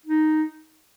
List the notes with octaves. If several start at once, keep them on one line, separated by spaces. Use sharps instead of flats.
D#4